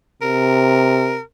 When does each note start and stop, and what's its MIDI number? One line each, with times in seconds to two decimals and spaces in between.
0.22 1.19 48
0.22 1.21 70